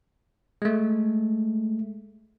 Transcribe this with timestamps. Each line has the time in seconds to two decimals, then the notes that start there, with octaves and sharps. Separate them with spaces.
0.62 G#3 A3